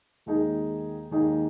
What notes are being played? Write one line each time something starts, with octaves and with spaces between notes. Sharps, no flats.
D#2 D#3 G#3 D#4 G#4
D#2 D#3 G#3 D#4 G#4